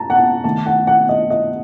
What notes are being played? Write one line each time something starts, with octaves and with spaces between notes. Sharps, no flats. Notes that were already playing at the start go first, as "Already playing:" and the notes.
Already playing: A5 A#5
F#5
A5
D#3 A3 D#4 A5
F#5
F#5
D#5
D#5